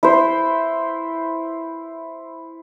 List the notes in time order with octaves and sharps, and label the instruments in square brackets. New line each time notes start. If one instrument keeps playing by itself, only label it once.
[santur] E4 C5